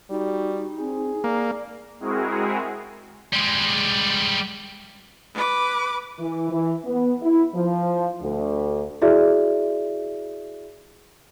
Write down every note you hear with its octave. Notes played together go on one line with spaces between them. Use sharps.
G3 D#4 F#4
C4 G#4
A#3 D5
G#3 C4 E4 F#4 G#4 A#4
G3 G#3
B4 D6
E3
E3
B3
E4
F3
D2
E4 F#4 G#4 D5 E5